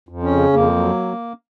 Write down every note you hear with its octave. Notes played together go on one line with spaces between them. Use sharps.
F2
C#4
C#3
F2 A#3
F#3